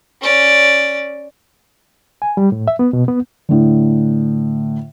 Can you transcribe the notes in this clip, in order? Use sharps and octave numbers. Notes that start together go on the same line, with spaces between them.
C#4 D5
G#5
G3
A2
E5
B3
B2
B3
A2 D3